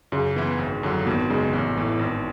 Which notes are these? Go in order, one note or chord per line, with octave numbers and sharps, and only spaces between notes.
F#2 C#3
E3 B3 E4
G#1
F#2 D3 F#3
G#1 B2
F#2 C#3 G#3
A1
A2 E3
G#1